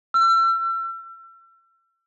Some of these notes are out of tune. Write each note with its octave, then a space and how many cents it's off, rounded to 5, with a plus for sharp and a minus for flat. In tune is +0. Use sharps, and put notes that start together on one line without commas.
E6 +35